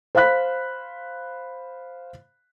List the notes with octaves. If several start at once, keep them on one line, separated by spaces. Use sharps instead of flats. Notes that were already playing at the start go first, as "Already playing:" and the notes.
C5 F5 B5 F#6 B6